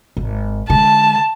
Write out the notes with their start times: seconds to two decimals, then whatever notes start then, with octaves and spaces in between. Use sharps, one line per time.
0.17 G#1
0.70 D3 G#3 A5